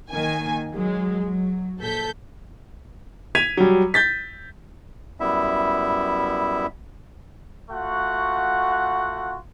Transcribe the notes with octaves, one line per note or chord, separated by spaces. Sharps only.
D#3 A#3 G#5
F#3 G#3
F#3
A#1 A4 G6 B6
G#6 B6 D#7 F7
F#3 G3
G6 A6 B6
F#2 G3 B3 E4 E5
A3 F4 F#4 F#5